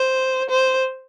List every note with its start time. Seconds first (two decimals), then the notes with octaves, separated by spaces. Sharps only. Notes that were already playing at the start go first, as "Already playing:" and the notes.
Already playing: C5
0.50 C5